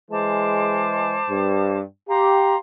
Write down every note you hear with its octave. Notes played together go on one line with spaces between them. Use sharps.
E3 G#3 C5 A5 D6
G2
G4 F5 A#5 C6